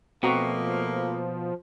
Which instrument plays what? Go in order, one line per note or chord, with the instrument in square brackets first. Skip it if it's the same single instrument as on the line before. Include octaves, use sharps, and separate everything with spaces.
[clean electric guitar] B2 [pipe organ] F3 [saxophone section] A3 A#3 [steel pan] C4 F#4 A#5